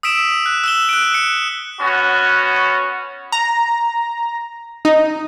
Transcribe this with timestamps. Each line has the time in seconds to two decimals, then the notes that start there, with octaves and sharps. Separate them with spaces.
0.03 D#6 E6 B6 D7 E7
0.46 F#6
0.64 E6 E7 G7
0.89 F#6 D7
1.14 F#6 C#7
1.80 B3 C#4 F#4
3.32 A#5
4.85 D#4